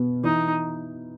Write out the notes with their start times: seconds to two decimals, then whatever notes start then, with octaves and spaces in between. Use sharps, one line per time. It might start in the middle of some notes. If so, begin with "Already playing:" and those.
Already playing: B2 B3
0.24 E3 D#4